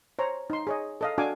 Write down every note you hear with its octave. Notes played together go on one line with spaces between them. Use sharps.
C5 C#5 A#5
D#4 C6
G#4 C#5 D#5
A4 D#5 F5
D4 F#4 A4 F5 G#5 D6